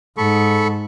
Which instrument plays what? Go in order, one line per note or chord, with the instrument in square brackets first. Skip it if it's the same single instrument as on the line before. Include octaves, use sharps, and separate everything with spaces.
[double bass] G#2 [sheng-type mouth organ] A4 B5 C#6